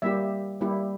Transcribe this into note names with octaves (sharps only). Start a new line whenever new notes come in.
G3 A#3 E4 G4 E5
G3 A#3 E4 G4